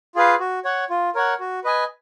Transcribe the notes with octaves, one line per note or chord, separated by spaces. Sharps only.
F4 G#4 B4 F5
F#4
C#5 F#5
F4
A#4 C#5 F#5
F#4
B4 D#5 G#5